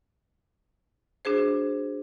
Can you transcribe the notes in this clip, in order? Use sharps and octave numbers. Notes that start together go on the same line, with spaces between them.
D4 F#4 G#4 C5